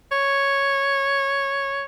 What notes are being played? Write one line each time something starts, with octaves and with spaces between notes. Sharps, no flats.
C#5